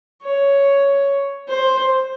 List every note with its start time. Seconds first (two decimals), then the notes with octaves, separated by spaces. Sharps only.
0.22 C#5
1.49 C5